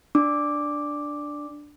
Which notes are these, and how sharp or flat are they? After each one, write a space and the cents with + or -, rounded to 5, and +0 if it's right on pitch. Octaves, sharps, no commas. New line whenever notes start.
D4 +0 D6 +0